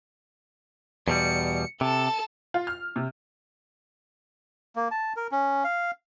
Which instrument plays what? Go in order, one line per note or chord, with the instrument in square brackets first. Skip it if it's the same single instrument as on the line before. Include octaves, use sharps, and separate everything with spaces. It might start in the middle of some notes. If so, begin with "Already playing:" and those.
[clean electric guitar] E2 B2 G3 [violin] C#7
[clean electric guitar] C3 [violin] A4 A5
[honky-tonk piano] F4
F6
C3
[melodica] A#3
A5
A#4
C#4
F5